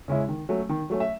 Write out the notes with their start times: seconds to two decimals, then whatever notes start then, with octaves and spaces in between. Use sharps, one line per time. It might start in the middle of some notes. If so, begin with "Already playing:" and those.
0.08 C#3 G#3 C#4 E4
0.29 D#3
0.49 F#3 A3 C#4
0.69 D#3
0.90 F#3 A3 C#4
1.00 E5